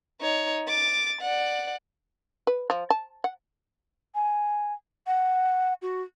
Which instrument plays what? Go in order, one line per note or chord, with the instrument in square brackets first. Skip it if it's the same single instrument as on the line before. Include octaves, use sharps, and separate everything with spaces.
[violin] D#4 C#5
D6 A6
D5 F#5
[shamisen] B4
F3
A5
F#5
[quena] G#5
F#5
F#4